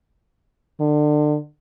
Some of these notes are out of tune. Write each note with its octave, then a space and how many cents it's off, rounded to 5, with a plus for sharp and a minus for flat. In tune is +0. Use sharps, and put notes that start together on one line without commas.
D3 +30